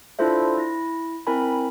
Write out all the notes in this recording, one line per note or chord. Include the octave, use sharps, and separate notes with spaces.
D4 E4 F4 A4 C5 E5
E4 A#6
C4 E4 A#4 G#5 B5